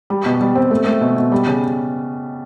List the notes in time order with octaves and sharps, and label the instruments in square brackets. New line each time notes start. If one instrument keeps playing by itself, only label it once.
[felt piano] G3
B2
G3
C4
A3
A3
B2
B2
G3
C#3